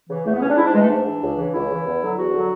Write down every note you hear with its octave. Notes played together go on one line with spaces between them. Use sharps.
C#3 E3
E2 A3
B3
C#3 E3 C#4
D4
G#2 E4
D4
E3 G#3
A3
G#2 D4
E3
C#2
C#3 E3
C#2 E4
C#3 E3
E2
D3 F#3
E2 F#4
D3 F#3